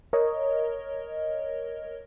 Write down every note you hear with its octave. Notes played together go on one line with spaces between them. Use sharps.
A#4 C#5 D#5